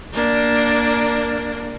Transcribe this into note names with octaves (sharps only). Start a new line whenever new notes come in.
A#3 D4